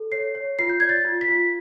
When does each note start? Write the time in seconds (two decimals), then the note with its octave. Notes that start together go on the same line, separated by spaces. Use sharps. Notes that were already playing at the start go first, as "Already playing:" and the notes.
Already playing: A4
0.12 C#5 C7
0.35 C#5
0.59 F4 C7
0.69 G6
0.80 D5 G#6
0.89 A6
1.05 F4
1.21 B6
1.28 F4